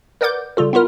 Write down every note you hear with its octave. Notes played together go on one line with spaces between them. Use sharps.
A#4 B4 D5 F#5 D6 G6
C#3 G3 F4 A4
B3 E4 F4 A#4